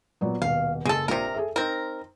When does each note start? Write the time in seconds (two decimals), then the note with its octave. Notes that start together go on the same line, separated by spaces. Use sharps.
0.21 A#2 F#3 B3
0.42 D#1 B2 F5
0.85 F#1 G#3 G#4 A4 D#7
1.08 A#1 C3 F4 A#4
1.34 G#4 A4 E5
1.56 C4 D#4 A#4 C5